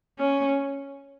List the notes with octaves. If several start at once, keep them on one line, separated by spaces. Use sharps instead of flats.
C#4